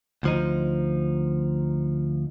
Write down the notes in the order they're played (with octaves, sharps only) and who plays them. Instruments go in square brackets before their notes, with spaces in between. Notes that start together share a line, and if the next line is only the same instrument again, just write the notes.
[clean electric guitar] D2 F3 D#4